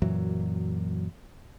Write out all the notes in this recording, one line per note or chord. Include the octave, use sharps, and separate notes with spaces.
F#2 A#2 E3 F#3